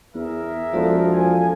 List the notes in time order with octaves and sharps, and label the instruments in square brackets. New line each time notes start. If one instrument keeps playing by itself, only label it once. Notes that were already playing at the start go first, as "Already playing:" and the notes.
[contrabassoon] E2 [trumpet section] G#4 A#4 E5
[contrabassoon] E1 [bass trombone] F3 [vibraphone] F#4 A4 D5
[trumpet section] G#5